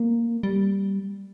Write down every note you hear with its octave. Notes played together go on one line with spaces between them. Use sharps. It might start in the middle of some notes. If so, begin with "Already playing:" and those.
Already playing: A#3
G3